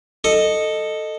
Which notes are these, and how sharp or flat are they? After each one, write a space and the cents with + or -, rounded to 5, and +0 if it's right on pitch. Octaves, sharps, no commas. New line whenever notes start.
A4 +5 D#5 -10